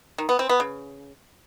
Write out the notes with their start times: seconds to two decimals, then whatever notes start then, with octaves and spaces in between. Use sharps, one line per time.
0.18 D#3
0.29 B3
0.39 C4
0.49 B3
0.60 C#3